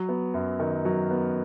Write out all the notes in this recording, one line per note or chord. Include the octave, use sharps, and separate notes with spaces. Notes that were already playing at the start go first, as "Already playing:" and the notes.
Already playing: F#3
B3
F#2
D#3
F#3
B3